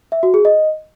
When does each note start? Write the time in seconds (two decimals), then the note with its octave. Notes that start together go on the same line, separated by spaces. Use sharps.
0.12 E5
0.23 F#4
0.34 G#4
0.45 D#5